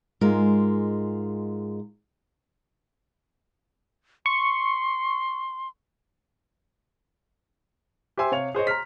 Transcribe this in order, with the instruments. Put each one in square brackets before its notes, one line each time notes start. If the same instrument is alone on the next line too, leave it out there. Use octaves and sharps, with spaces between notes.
[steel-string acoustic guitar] G#2 G#3 F4 A#4
[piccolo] C6 [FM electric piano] C#6
[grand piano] G4 C5 E5 G#5 C6 E6
C3 C#5 F5 F7
G#4 C5 C#5 D#5
A#5 C6 F6 B6